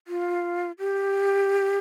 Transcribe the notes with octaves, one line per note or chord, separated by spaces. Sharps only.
F4
G4